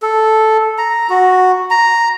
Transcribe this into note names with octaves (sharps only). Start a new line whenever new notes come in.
A4
A#5
F#4
A#5